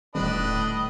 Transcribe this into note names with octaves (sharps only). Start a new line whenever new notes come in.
D#1 A2 D3 D4 B4 D#5